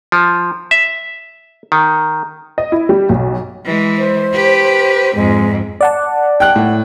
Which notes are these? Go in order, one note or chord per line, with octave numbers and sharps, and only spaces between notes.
F3
E5
D#3
D#5
E4
G3
B1
E3 G#3
C5
G4 B4
F2 G#2 G#3
D5 F#5 A5
G5 F#6
A2